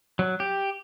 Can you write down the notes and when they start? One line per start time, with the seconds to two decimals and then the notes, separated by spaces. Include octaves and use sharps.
0.19 F#3
0.40 G4